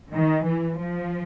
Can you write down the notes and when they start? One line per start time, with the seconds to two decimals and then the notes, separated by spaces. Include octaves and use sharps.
0.13 D#3
0.46 E3
0.78 F3